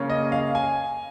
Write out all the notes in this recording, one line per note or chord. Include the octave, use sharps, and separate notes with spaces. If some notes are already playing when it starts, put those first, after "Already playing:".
Already playing: C#3 A#3 C#4
D#5
F5
G#5